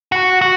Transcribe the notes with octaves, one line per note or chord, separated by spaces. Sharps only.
F#4
F#4